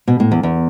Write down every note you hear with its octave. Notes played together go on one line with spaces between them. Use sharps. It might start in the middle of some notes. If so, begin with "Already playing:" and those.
B2
A2
E2
E2